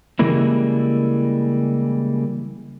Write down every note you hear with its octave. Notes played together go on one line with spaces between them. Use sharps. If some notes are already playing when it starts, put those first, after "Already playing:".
C#3 E3 G3 G#3 A#3 E4